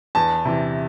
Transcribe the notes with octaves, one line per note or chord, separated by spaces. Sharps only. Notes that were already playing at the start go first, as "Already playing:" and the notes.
E2 A5
C3 E3